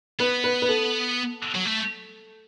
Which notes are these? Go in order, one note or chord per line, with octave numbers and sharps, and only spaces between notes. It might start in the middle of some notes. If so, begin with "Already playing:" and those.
B3 B4
B4
B4
A4
F#3
A3